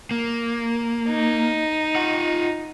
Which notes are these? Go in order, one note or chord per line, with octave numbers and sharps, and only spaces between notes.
A#3
D#4
F4 F#5